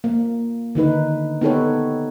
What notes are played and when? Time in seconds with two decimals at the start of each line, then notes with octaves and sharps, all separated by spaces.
0.04 A#3
0.75 D3 D#3 D#4 B4
1.41 B3 D#4 G4 A4 B4 C#5